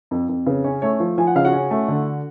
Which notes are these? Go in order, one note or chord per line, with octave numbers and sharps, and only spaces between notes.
F2
F2
C#3 B4
C#4 C#5
A3 C#5
F3
F3 G#5
F#5
C#3 F5
F#4 F#5
C#4
A3
D3